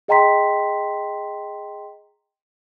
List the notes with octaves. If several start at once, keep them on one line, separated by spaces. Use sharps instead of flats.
G#4 D#5 G5 A#5 C6 B6